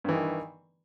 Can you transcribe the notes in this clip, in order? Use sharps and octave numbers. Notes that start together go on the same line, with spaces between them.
G2 D#3 E3